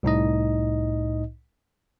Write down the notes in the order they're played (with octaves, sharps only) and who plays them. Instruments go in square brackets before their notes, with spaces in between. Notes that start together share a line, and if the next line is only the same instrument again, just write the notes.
[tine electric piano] C2 A2 D#4 D#5